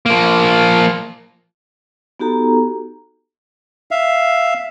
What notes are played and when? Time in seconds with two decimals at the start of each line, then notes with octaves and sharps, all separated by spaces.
0.06 F3 A#3
2.20 B3 D#4 F#4 G4 A4 A#5
3.91 E5 F5